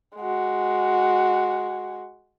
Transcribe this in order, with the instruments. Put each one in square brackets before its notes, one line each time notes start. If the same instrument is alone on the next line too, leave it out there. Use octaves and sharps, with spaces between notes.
[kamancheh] G#3 F#4